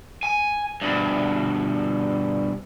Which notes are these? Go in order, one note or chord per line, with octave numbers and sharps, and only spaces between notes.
G#5
G2 B2